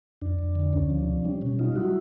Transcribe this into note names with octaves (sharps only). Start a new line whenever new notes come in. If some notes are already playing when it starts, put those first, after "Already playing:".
F2 D4
F2
D3
D2 C#4
F3
D4
C3
G3 C#4
B2 C#4
G3 D#4 F4
F#3 E4 F#4